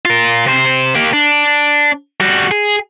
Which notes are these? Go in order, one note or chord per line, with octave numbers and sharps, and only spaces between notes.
F4 A#4
C3 C5
A#3 G4
D4
G3 F#4
G#4